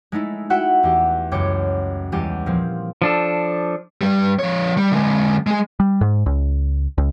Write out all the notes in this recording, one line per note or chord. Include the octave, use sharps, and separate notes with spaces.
G#3 A3 D#4 E4
E4 F#4 E5 F#5 G5
E2 G4
C#2 F#2 C#5 G5 D6 C#7
E2 G3 G#3 G4 D#7
A#2 F3 C4
F3 D4 A4
G2 G3
F3 C#5
G3
D3 G#3
G#3 G#4
G3
G#2
C#2
C#2